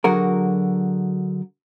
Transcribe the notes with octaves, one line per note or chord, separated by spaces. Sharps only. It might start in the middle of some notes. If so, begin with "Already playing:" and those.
D3 F#3 F#4 G#4 A#4